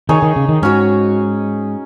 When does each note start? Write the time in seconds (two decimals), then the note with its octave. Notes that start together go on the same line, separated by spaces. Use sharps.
0.09 D#3 D#4 G#4 C#5
0.22 D#3
0.36 C#3
0.49 D#3
0.62 G#2 C#4 F#4 C#5